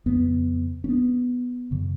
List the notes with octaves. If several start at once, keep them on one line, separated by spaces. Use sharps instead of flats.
F2 C#3 B3
C#4
B3
F#2 C#3